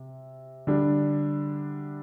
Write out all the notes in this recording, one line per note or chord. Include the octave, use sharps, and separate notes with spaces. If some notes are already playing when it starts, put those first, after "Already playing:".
Already playing: C3
D3 G3 D4